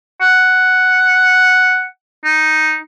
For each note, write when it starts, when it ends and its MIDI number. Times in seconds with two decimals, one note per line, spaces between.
0.21 1.85 78
2.25 2.78 63